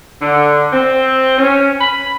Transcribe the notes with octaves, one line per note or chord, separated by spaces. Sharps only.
D3
C4
C#4
B5